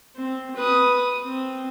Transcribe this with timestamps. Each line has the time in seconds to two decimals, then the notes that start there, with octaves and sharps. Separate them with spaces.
0.16 C4
0.57 B4 D#6
1.26 C4